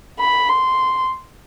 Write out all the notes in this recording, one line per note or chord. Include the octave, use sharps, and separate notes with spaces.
B5
C6